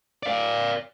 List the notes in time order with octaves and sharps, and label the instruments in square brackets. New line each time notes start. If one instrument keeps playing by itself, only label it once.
[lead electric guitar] D5 F5